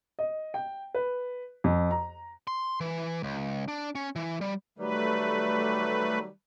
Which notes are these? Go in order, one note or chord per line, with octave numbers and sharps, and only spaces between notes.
D#5
G5
B4
F2
A#5
C6
E3
C#2
D4
C#4
E3
G3
D#3 F#3 G3 A3 B4